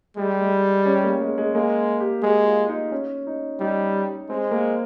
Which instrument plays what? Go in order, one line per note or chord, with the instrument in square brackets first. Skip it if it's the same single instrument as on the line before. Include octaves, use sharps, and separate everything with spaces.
[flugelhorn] G3 [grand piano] G#3
[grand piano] G#3
C#4
A#3
G#3
G#3
[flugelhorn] G#3 [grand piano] A#3
[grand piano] G4
[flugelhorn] G#3 [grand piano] G#4
[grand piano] F4
D#4
C#4
D#4
[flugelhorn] G3 [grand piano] D#4
[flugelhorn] G#3 [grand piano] C4
[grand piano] A#3